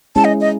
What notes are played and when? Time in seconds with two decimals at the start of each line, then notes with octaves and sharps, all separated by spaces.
0.16 G#3 C#4 E4 G#4 A5
0.24 D#5
0.41 D#5